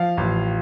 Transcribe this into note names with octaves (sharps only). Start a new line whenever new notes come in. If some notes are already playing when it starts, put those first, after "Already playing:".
Already playing: F3 F5
A1